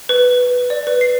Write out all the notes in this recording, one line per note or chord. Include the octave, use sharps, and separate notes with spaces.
B4
D5
B4
C7